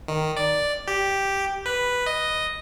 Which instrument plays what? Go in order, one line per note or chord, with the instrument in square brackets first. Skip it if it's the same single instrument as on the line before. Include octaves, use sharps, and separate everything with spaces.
[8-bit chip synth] D#3
D5
G4
B4
D#5